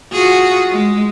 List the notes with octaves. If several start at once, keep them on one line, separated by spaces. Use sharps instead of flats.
F4 F#4 G#4
G#3